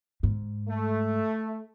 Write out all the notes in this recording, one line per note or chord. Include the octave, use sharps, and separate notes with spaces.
G#2
A3